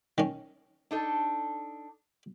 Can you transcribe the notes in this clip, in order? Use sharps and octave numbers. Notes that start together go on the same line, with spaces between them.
D#3 C#4
D4 D#4 A4